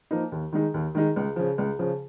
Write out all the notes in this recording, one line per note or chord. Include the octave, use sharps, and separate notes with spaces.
F3 A#3 D#4
D#2
D#3 G#3 D#4
D#2
D#3 G#3 D#4
C#2
C#3 F3
C#2
C#3 F3